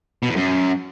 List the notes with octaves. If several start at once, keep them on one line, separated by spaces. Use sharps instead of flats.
B2
E2
F#2